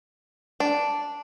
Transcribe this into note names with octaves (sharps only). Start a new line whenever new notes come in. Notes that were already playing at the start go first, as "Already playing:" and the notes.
D4